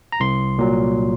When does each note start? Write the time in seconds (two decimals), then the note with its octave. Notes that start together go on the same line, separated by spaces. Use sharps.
0.12 A#5
0.20 C2 C6
0.59 A#2 F#3